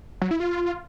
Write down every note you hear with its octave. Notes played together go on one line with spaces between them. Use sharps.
F#3
E4
F4